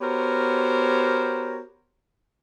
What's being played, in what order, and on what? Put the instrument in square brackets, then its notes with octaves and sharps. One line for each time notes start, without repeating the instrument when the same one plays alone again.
[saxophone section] B3 F#4 G4 A#4 C5 C#5